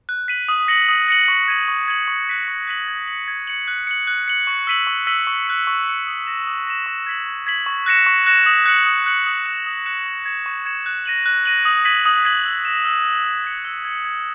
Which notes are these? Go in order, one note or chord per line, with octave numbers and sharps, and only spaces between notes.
F#6
B6 D#7 F#7
D#6
A#6 C#7 F#7
D#6
A#6 C#7 F#7
C#6
G#6 D#7 F#7
C#6
G#6 D#7 F#7
C#6
F#6 B6 D#7 F#7
C#6
F#6 B6 D#7 F#7
G#6
C#7 F#7
G#6
C#7 F#7
F#6
C#7 F#7
F#6
C#7 F#7
C#6
E6 B6 D#7 F#7
C#6
E6 B6 D#7 F#7
C#6
F#6 C#7
C#6
F#6 C#7
D#6
A#6 E7
D#6
A#6 E7
C#6
G#6 B6 F#7
C#6
G#6 B6 F#7
C#6
F#6 A#6 C#7 E7
C#6
F#6 A#6 C#7 E7
D#6
F#6 C#7 F#7
D#6
F#6 C#7 F#7
D#6
F#6 C#7 E7
D#6
F#6 C#7 E7
C#6
G#6 C#7 E7
C#6
G#6 C#7 E7
F#6
A#6 D#7 F#7
F#6
A#6 D#7 F#7
D#6
G#6 B6 D#7 F#7
D#6
G#6 B6 D#7 F#7
E6
A#6 E7
E6
A#6 E7
E6
G#6 C#7
E6
G#6 C#7
G#6